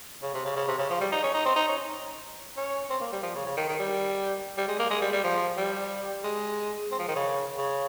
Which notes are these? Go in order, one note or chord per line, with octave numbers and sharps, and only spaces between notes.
C#3
C3
C#3
C#3
C3
C#3
F3
G3
D#4
C#4
D#4
C4
D#4
C#4
C#4
C4
A#3
G3
F3
C#3
C#3
D#3
D#3
G3
G3
G#3
A#3
G#3
G3
G3
F3
G3
G#3
C4
F3
D#3
C#3
C#3